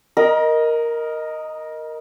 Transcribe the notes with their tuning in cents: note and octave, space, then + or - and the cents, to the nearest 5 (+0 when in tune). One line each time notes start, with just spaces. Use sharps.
A#4 +0 D#5 +0 A#5 +35